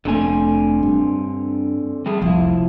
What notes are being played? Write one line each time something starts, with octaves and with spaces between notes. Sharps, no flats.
F1 D3 A3 C4 G#5
G2
G3 A3 G#4
F1 C2 F3 E4